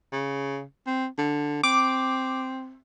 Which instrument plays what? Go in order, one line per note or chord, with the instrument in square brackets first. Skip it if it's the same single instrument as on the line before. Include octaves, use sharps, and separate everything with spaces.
[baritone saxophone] C#3
C4
D3
[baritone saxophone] C4 [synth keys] D6